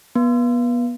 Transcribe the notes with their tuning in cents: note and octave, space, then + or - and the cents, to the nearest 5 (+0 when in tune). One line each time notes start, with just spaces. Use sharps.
B3 -30